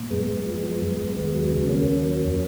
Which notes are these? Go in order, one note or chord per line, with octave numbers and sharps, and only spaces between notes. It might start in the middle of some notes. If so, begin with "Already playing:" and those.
Already playing: A#2
F#2 G#3 B3
F#2
F3
F3
F#2
F#2
D#2 G#3 B3
F#3
C#3
D#2 A#3 C#4
D#2
F#3
F2